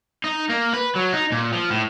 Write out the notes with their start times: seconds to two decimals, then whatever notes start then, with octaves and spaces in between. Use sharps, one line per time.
0.24 D#4
0.50 A#3
0.74 B4
0.96 F#3
1.13 D#4
1.32 A#2
1.52 F3
1.70 A2